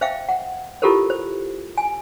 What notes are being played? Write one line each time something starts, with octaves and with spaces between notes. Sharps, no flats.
C5 E5 F5 G5
F#5
E4 F4 G4 A4 A#4 C5
C5
G#5